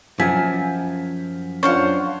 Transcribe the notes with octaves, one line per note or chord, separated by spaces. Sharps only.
F#2 F3 G#5 B6
C#4 D4 F4 C5 F5 F#5 C#6